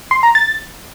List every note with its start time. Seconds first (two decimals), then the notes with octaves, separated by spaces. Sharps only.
0.11 C6
0.23 A#5
0.35 A6